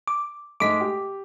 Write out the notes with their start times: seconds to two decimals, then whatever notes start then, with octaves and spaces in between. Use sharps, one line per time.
0.08 D6
0.60 G#2 G#3 A3 D6 B6
0.81 G4